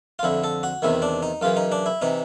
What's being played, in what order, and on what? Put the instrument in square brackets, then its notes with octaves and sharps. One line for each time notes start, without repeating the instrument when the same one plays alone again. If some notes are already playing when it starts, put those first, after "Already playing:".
[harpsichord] F4
F2 D3 E4
A4
F#4
E2 C3 D#3 E4
D4
D#4
F#2 C#3 E3 F4
D#4
D4
E4
C3 E3 D#4